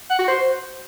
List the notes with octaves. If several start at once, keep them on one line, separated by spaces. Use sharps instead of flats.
F#5
F#4
C5